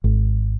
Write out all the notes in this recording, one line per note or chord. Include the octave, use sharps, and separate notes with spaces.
G#1